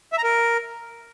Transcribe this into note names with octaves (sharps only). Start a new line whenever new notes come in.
E5
A#5
A#4